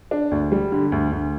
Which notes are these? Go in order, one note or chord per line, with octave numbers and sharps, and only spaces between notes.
D4
D2
G3
D3
D2
D2